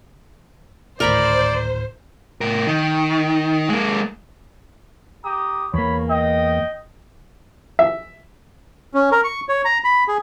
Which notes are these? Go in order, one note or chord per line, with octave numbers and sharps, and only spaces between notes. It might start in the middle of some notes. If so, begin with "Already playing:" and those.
G#1 D2 A2 A#4 C5 D5 A#5 B5
A2 A#4
D#3
G#3 A#3
G4 A#5 D#6
E2 A#3 C#5 B5
D#5 G5
E5
C#4
A#4
C#6
C#5
A#5
B5
G#4